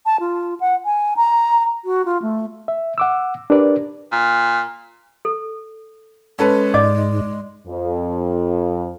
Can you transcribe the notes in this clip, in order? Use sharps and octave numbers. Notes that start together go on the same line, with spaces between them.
A5
F4
F#5
G#5
A#5
F#4
F4
A3
E5
F#5 D6 E6
D4 G4 A#4 B4 D5
A#2
A4
G#3 C#4 A4 B4
G#2 D5 D#5 D6
F2